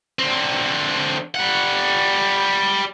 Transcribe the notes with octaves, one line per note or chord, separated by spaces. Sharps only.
D3 C4
G3 F#5